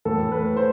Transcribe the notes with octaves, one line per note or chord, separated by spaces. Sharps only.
A2 E3 A4
B4
C5